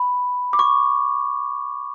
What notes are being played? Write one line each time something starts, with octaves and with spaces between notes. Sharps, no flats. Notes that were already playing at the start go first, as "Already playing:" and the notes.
Already playing: B5
D6
C#6